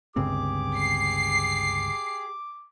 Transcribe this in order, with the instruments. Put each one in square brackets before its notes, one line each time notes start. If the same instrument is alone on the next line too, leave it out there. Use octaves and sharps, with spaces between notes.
[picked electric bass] G1 C#2 C4 [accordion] G4 G#4 [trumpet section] D6
[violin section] C7